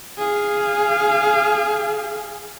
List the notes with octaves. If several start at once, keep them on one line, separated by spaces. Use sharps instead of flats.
G#4 F5